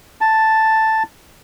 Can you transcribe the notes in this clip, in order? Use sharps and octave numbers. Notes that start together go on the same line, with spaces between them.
A5